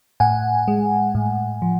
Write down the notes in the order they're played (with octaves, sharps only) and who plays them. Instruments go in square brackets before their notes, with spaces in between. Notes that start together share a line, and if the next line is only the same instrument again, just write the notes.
[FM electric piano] A2 F#5 G#5
G#3
A2
F3